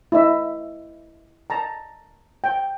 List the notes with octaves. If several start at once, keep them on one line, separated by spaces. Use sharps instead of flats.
E4 D#5 E5
A5 A#5
G5